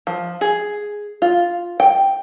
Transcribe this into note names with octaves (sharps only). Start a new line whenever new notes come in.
F3
G#4
F4
G5